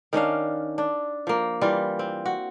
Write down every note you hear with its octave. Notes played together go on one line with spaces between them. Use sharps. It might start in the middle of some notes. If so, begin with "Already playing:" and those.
D#3 C#4 D4 F5
D4
F3 A#3
E3 G3 F4
C4
F#4